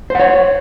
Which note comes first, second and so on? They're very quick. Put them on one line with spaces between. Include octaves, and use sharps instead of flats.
C5 F#5 C#5